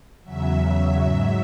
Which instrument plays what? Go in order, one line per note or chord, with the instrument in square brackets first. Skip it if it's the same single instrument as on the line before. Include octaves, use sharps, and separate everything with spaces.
[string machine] E2 C#3 F#3 E5
G#2 F#3